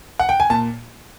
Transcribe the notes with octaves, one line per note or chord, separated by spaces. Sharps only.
F#5
G5
G#5
A#2 A5